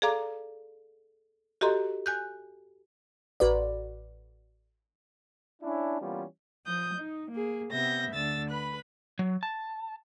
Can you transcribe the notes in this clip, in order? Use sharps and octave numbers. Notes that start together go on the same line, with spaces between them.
G#4 A4 D5 F5 A#5 D6
F#4 G4 A4 D#5 A#5 C6
G#5 F#6 G6
A1 F#4 B4 D5
C#4 D4 E4
E3 G3 A#3 B3 C#4 F4
F3 D#6 G6
D#4
A#3 G#4
C3 B3 E5 G6 A#6
D2 D3 E6 A6
B4 B5 F#6
F#3
A5